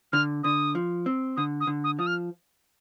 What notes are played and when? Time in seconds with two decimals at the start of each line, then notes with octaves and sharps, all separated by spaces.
0.13 D3 F6
0.43 D3 D#6
0.75 F3
1.06 C4
1.36 D3 D#6
1.60 D#6
1.67 D3
1.84 D#6
1.99 F3 D#6
2.07 F6